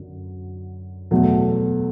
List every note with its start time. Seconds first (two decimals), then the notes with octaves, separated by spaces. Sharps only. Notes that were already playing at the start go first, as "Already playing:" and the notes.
Already playing: F#2 D3 F#3
1.11 E2 B2 F#3 A3